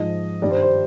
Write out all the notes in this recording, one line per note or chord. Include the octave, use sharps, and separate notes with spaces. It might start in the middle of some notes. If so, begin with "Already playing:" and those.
Already playing: G#2 F3 G#3 D#5
G2 D#3 G3 D5
C5
C5